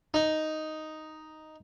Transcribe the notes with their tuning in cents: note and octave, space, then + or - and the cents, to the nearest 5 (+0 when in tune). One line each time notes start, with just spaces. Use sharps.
D#4 +0